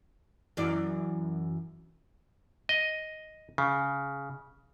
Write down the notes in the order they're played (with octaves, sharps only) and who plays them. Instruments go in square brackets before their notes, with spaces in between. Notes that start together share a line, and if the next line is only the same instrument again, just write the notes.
[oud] F#2 E3 D5
[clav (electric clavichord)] D#5
C#3